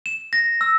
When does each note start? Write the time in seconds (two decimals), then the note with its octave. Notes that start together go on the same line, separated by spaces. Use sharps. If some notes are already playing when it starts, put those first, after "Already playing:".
0.06 E7
0.33 A#6
0.61 E6